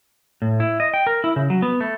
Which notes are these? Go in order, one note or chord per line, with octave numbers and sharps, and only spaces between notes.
A2
E4
D#5
G5
A#4
E4
C#3
F#3
B3
A3